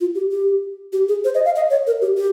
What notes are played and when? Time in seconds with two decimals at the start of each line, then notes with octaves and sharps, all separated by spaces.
0.01 F4
0.15 G4
0.31 G4
0.93 G4
1.08 G#4
1.24 C5
1.35 D#5
1.45 F5
1.56 D#5
1.70 C#5
1.87 A#4
2.01 G4
2.17 G4